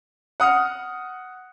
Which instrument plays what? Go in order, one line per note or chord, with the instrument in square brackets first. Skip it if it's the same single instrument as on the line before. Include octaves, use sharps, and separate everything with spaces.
[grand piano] F#5 D#6 F6 C#7